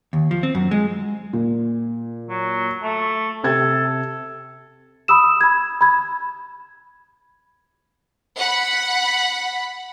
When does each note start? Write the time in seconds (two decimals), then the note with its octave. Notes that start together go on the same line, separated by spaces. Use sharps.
0.13 D#2
0.31 F3
0.43 C4
0.55 F#2
0.71 G#3
1.33 A#2
2.29 F#3
2.83 A3
3.44 C3 A4 G#6 A6
5.08 B5 D#6 E6 E7
5.41 B5 G#6
5.81 B5 G#6
8.39 F#5 B5